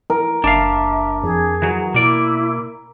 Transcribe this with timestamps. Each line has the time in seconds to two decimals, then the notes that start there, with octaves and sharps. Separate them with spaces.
0.10 E3 A#4
0.44 F#1 D4 E5 F5
1.23 F2 G#4
1.62 E3 F#3
1.94 B2 A#3 E4 D5